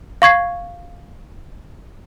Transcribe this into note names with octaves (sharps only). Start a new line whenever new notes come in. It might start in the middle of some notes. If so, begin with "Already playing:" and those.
F5 C#6 G#6 C7